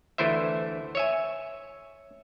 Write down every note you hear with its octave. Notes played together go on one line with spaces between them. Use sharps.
D2 E3 A3 E4 C5 E5
C#5 E5 G#5